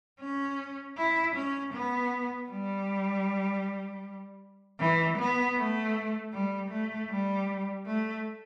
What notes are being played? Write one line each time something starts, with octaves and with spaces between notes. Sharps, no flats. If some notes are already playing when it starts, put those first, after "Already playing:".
C#4
E4
C#4
B3
G3
E3
B3
A3
G3
A3
G3
A3